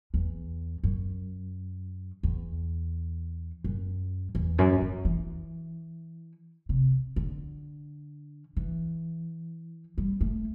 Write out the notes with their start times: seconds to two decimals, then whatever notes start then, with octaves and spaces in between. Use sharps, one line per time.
0.14 E2
0.84 F#2
2.23 E2
3.64 F#2
4.35 E2
4.58 F#2
4.81 F#2
5.05 E3
6.69 C3
7.16 D3
8.57 E3
9.98 G3
10.21 A3